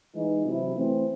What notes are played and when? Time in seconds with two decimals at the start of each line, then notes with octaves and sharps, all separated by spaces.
0.14 E3 G#3 D#4
0.44 C3 F#3 C4 E4
0.74 E3 A3 C4